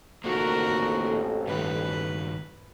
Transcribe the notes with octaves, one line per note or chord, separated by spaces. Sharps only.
A1 F2 A#3 D4 D#4 F#4 A#4
G2 D#3 B4